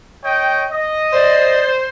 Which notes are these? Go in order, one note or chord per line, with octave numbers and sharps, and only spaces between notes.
C#5 D#5 G5
D#5
C5 D5